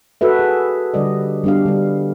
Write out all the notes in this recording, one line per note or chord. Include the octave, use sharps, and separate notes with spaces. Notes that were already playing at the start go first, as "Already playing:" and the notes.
F#4 A4 B4 E5
G#4
D3 G3 D5 D#5
G3 B3 D4 G4 F5
D3 G3